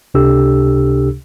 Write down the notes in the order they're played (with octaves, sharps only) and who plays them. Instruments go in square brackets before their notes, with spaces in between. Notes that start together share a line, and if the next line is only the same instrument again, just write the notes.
[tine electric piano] C#2 C3 D4 G4 A4 E6